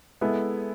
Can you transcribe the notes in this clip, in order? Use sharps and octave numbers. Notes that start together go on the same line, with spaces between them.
G#3 B3 E4 A4